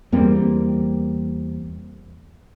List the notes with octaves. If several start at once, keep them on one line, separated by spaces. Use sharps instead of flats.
E2 G3 A#3 C4